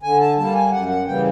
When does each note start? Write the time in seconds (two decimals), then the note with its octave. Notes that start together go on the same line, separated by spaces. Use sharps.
0.03 D3 G#5
0.20 A5
0.37 G3 A#3 A5
0.55 G#5
0.71 F#2 F#5
0.88 F#5
1.06 C#3 E3 G3 A#3 G5